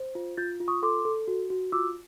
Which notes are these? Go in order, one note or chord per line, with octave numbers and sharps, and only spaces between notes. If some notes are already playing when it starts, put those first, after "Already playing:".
Already playing: C5
F4
F4 G6 A6
F4
C#6 D#6
A4 C6 D6
A4
F#4
F#4
F4 D6 E6